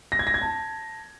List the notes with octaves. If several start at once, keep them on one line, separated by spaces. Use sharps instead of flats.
A#6
G#6
A#6
G#6
A5